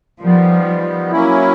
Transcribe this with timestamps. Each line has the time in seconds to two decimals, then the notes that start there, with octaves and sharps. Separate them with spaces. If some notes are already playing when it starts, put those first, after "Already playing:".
0.20 D#3 F3 G3 B3
1.11 F#3 A#3 C#4 E4